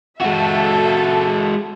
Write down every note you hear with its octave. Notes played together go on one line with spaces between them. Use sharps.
G#3 F#4 A4 E5